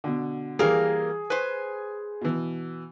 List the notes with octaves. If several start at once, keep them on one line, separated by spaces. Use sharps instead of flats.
B2 D3
E3 G3 A#3 G#4 A#4 F5
B4 C5 G#5
B2 E3